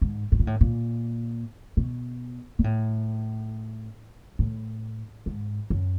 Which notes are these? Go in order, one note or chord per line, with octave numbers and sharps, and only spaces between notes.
G#2
A2
A#2
A2
A#2
B2
A#2
A2
A2
G#2
F#2